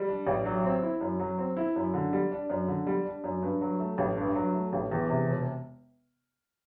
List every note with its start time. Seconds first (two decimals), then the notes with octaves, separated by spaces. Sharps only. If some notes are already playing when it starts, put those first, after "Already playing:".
Already playing: G3
0.08 D4
0.27 A1
0.45 F#3
0.64 C4
0.82 E4
1.01 F#2
1.19 F#3
1.38 C4
1.57 E4
1.76 F#2
1.94 D3
2.13 G3
2.31 D4
2.50 F#2
2.68 D3
2.87 G3
3.05 D4
3.24 F#2
3.42 G2
3.61 F#3
3.79 A3
3.98 A1
4.17 G2
4.35 F#3
4.54 A3
4.73 A1
4.92 E2
5.10 C3
5.28 E1